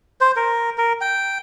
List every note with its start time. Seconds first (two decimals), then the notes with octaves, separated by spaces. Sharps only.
0.21 C5
0.36 A#4
0.78 A#4
1.01 G5